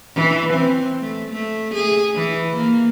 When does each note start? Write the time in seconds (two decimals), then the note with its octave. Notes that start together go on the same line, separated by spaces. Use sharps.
0.15 E3
0.53 C4
1.01 A3
1.30 A3
1.75 G#4
2.15 E3
2.56 A#3